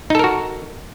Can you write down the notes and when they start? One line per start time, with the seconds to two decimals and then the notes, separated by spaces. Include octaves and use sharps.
0.10 D#4
0.15 A4
0.19 A#4
0.24 F#4